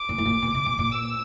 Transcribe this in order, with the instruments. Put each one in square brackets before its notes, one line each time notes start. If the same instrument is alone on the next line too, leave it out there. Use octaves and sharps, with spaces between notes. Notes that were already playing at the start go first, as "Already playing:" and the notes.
Already playing: [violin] D6
[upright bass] A#2
A2
A#2
B2
C3
B2
A#2
[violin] E6